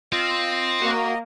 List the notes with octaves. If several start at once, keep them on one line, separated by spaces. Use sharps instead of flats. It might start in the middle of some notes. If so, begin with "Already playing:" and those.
C4 F4 D#5
A#3 F#4 A#4